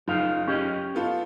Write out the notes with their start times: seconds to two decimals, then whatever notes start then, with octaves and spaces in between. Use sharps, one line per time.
0.08 F#1 D#4 F4 F5
0.48 C#4 G4 D#5
0.95 B3 F4 A4